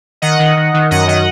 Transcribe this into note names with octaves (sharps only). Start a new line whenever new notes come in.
D#3 D#5 F#5
D#3
D#3
D#3
F#2 D#5 F#5
D#3 D#5 F#5